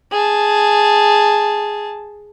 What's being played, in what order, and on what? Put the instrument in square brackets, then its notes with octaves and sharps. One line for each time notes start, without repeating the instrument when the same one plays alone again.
[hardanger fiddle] G#4 A5